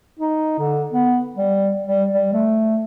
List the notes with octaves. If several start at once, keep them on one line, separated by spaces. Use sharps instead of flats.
D#4
D3
B3
G3
G3
G3
A3